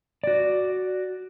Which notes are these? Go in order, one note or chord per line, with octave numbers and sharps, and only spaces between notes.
F#4 D5